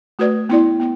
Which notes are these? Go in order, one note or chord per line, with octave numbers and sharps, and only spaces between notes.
A3 F#4 B4 D5
B3 E4 D5
B3